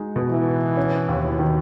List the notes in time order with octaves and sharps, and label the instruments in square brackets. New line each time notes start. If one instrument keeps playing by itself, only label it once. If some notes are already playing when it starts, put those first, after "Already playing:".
Already playing: [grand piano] G#3 D#4 F#4
B2
[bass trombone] E3
[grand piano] F#4
C#4
D#2
D#3